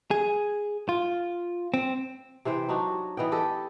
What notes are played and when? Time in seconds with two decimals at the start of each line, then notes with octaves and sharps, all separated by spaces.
0.11 G#4
0.89 F4
1.74 C4
2.45 C3 E3 C5 G5
2.69 F#3 D4 D#4 F#4
3.17 E3 B3 D#5 G5
3.32 G4 A4 D#5